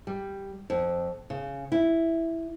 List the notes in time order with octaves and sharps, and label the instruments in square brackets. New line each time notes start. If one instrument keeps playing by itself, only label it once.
[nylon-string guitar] G3
F2
C#3
E4